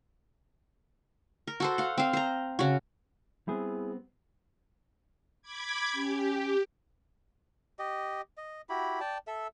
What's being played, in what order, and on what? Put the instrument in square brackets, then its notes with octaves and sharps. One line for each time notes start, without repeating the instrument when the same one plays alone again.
[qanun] A#4
F#4 A4 C5
F5 F#5
C4 F5
C5 A#5
C#3 F#4
[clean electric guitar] G3 B3 C4 [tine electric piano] E4 G#4
[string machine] B5 D6 G#6
[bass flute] C#4 [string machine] G4
[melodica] G4 D#5
D#5
E4 F#4 G4 B5
D5 G5 A5
A4 E5